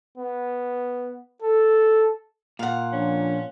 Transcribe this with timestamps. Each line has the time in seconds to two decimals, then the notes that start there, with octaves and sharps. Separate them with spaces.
0.18 B3
1.42 A4
2.59 A#2 F5 F#5
2.92 F3 C#4 D4